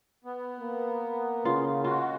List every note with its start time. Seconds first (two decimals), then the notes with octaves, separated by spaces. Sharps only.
0.25 B3
0.60 A#3
1.45 C#3 F4
1.84 G#3 F4 F#4